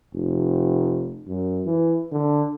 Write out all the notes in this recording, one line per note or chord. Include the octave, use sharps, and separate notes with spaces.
F1
F#2
E3
D3